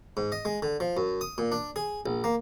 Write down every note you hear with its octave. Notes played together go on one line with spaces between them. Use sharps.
G#2
D#5
G#3
D3
F3
F#2
D#6
A#2
D4
G#4
A#1
A#3